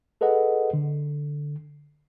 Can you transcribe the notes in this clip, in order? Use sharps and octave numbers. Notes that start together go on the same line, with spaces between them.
G#4 A4 B4 D#5 F#5
D3